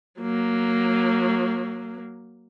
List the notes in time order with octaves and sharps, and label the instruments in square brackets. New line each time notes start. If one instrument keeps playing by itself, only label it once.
[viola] F#3 A#3